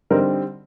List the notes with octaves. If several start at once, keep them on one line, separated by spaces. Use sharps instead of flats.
D3 G3 C4 D#4 A#4